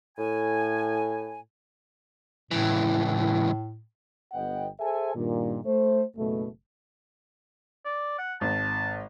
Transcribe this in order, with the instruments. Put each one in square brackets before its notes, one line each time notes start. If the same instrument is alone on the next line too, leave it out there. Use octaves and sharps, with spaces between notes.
[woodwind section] A2 G#5
[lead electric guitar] C#2 E3 [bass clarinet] A2
[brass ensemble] G1 B3 D#5 F#5 G5
G#4 A4 C5 E5 G#5
G2 A#2 D#3
A3 C5
F#1 F#2 B2 A3
[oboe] D5
F#5
[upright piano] G#1 [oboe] A5